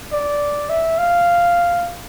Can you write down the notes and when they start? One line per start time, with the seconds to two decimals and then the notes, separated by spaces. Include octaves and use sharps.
0.12 D5
0.69 E5
0.98 F5